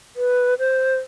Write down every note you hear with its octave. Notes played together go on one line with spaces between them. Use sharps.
B4
C5